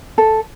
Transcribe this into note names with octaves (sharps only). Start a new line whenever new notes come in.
A4